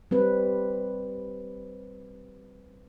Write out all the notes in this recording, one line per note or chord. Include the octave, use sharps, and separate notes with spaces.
G3 C4 B4